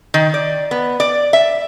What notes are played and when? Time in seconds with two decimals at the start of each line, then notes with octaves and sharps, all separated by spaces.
0.14 D#3
0.34 D5
0.71 B3
1.00 D5
1.33 E5